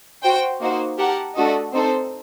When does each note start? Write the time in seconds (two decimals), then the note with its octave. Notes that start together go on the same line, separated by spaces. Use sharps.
0.22 F#4 C5 G5
0.60 A#3 D#4 F#4 C5
0.97 G4 A#4 F#5 A5
1.35 A3 D4 F#4 A4 D#5
1.72 C4 D#4 A4 C5